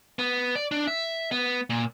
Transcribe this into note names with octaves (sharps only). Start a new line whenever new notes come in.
B3
D5
D4
E5
B3
A#2